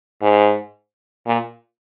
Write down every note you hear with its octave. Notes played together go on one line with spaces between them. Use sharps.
G#2
A#2